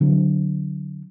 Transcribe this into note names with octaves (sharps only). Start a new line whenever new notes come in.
D3 F#3 C4